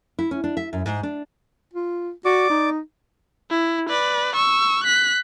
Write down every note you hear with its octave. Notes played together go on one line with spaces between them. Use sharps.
E4
C#4
D4
E5
F#2
G#2
D4
F4
F#4 D5 D6
D#4
E4
B4 D5
C#6 E6
F#6 B6